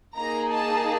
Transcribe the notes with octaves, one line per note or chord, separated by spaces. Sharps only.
A#3 D#4 G#4 A#5
A5